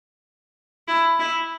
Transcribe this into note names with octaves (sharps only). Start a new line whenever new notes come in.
E4
E4